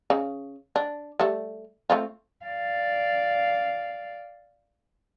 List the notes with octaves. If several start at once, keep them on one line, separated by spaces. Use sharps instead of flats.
C#3
D4
G3 A3
A3 C4 F4
D5 F5